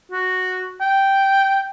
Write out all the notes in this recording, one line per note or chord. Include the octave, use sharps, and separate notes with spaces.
F#4
G5